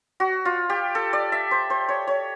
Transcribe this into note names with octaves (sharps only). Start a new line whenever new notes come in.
F#4
F4
G4
A4
D5
E5
C5
C5
C#5
C#5